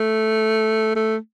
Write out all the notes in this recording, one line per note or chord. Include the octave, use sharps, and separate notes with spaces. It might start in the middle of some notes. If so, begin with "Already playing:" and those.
Already playing: A3
A3